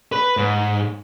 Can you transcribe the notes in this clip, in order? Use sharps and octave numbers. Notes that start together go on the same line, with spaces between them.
B4
G#2